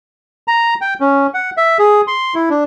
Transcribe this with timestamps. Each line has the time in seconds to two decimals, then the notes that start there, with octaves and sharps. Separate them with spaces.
0.48 A#5
0.81 G5
1.01 C#4
1.34 F#5
1.57 E5
1.79 G#4
2.07 C6
2.35 E4
2.50 D4